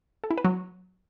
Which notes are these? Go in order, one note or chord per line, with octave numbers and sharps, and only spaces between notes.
A4
E4
B4
F#3